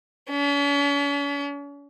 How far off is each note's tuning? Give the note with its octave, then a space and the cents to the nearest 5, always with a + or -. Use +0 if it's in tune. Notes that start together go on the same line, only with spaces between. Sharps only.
C#4 +45